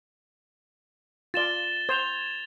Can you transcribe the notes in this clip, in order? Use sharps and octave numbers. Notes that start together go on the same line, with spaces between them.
F4 D5 A6 E7 G7
C5 G#6 E7 F7